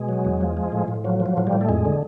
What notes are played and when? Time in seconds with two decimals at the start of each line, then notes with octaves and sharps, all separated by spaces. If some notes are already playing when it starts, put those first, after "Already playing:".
Already playing: B2 G#3
0.09 F#3
0.25 E2
0.41 F3
0.57 F3
0.72 A2
0.88 A2
1.04 F3 F#3
1.20 F3
1.26 F#3
1.37 A2 F#3
1.47 G3
1.53 A2
1.61 A3
1.69 F2 G#3
1.85 D3